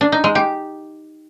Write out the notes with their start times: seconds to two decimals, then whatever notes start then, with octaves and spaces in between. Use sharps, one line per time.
0.01 D4
0.12 D#4
0.24 G#3
0.35 G4